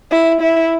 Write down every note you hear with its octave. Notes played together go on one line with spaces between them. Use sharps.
E4
E4